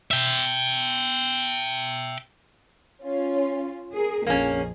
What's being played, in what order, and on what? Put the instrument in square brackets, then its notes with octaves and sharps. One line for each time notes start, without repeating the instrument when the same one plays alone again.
[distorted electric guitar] E5 G5
[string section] C#4 F4
G#4 A#4
[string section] A#1 F2 G#4 [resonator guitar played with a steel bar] A#3 C#4